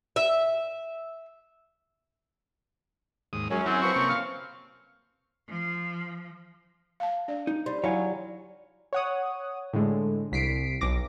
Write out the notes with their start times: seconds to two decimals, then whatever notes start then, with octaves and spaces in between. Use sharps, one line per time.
0.16 E5
3.33 D#2 G#2 D#6
3.51 F#2 F#3 G#3 C#4
3.66 F#3 C4 E4 F#4
3.82 F3 B4 C#6
3.96 C3 A#3 C#4
4.09 F5
5.48 F3
7.00 F5 A5
7.28 D4 D5
7.47 D#4
7.66 G3 C5
7.84 F#3 E4 C#5 F5 G#5
8.93 C#5 F#5 D#6
9.73 A2 D3 G#3
10.32 C2 B6 C7 D7
10.81 B1 D6 A#6